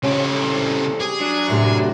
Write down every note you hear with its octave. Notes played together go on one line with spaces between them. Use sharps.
F2 C#3 C#4 G4
C2 A4
G4 G#4
F#3 D4
F#2 A2 C3